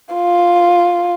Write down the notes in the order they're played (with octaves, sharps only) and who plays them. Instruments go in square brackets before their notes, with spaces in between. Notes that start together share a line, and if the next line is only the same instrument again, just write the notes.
[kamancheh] F4